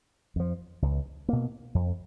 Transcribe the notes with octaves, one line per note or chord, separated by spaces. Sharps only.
F2 F3
C#2
B2 A#3
F2